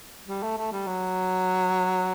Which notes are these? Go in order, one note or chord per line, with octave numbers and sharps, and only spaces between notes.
G3
A3
A3
G3
F#3